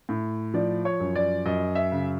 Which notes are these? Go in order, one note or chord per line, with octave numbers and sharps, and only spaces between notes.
A2
F3 D5
C#5
F#2
D5
F#2 D#5
E5
C#3